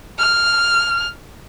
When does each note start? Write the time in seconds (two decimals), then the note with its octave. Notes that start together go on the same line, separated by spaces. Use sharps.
0.18 F6